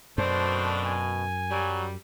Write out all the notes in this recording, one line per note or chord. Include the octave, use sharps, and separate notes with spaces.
F#2 B2 A3 C4 D4 C5
G#5
F#3 G3